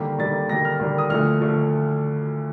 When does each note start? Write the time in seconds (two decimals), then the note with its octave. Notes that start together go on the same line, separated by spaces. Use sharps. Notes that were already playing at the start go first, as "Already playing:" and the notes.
Already playing: D#2 D3 G3 A#3
0.19 D#2 D3 G3 A#3 A6
0.49 D#2 D3 G3 A#3 A#6
0.65 F6
0.80 D#2 D3 G3 A#3
0.98 D#6
1.10 D2 D3 F3 A3 F6
1.41 D3 F3 A3